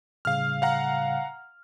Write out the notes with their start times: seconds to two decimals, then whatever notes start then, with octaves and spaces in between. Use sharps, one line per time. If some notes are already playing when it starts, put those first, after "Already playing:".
0.25 A2 C#3 G3 F5 F6
0.62 F5 F#5 A#5